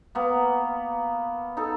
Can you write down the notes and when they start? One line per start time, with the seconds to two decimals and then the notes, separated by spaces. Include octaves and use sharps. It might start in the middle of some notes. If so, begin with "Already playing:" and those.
0.15 A#3 B3
1.57 D#4 A4